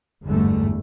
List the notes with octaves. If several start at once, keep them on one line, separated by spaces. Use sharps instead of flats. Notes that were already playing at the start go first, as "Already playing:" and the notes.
G1 E2 G#2 D3 G3 A3